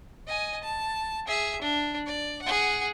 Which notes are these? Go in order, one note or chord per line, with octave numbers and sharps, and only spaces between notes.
D#5 G#5
A5
G#4 E5
D4
D5
G#4 F#5